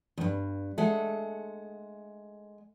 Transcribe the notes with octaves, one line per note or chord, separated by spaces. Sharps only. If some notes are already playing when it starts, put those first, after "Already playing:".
E2 G2
G#3 A3 F#5